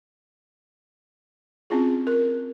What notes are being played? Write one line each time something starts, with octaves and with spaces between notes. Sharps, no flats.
C4 C#4 E4 F4 G#4
A#4